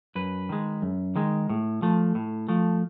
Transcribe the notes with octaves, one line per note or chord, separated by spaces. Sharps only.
F#2 B4
D#3 G#3
F#2
D#3 G#3
A2
F3 A3
A2
F3 A3